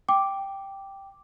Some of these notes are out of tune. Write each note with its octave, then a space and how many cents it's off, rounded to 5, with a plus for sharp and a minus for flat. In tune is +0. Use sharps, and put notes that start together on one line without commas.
G5 +0 D6 +0